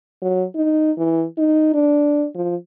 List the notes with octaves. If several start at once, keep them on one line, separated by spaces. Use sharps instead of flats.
F#3
D#4
E3
D#4
D4
F3